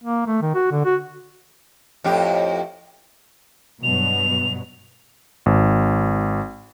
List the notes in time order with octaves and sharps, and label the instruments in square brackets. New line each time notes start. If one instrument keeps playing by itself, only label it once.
[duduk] A#3
A3
D#3
F#4
D3
F#4
[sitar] F2 A2 G4
[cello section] G2 B2 F#3 [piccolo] F7
[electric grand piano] G#1